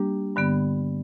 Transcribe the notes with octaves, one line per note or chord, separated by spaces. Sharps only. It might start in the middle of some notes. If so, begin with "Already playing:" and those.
Already playing: G3 A#3 D4 G4
G2 D3 G3 B3